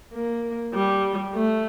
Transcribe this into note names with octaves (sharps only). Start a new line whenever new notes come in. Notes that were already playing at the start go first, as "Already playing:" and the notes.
A#3
G3
A3